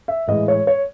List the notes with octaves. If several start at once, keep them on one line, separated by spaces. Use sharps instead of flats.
E5
A2 E3 G#3 D#5
C#5
C#5